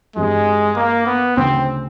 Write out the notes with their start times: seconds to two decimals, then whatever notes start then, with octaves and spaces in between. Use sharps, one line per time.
0.16 G2 E3 G3 G#3 C4
0.76 A#3
1.06 B3
1.37 D2 C#3 E3 C4